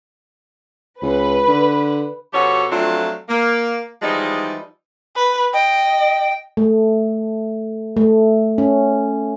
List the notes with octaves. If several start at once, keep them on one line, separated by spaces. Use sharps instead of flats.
C#2 B4
D3
B2 F3 F#4 G4 A4 C#5
F3 F#3 A3 C4 D4 F4
A#3
E3 F3 G3 G#3 D#4
B4
D#5 G5
A3
A3
C#4